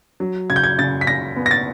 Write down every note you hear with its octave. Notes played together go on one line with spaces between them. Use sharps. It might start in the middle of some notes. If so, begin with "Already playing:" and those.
F#3
C#3 G#6
G6
G#6
C#3 A6
B6
C#3 A#6
B3
A#6
A6